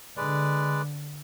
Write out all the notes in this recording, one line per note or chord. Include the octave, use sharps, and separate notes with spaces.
D3 G#3 B4 D5